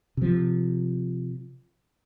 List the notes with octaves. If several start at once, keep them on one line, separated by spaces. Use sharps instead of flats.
C3 F3